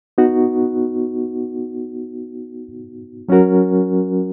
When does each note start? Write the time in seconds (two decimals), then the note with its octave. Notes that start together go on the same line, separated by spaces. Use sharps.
0.18 B3 D#4 F#4
3.29 F#3 C#4 F#4 A#4